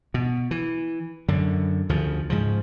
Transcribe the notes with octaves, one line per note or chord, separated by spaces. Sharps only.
B2
E3
F#2 D3
D2 C#3 F3
G#2 C#3 F3